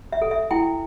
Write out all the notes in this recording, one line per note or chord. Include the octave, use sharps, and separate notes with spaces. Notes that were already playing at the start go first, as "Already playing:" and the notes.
E5
A4
E5
E4 G5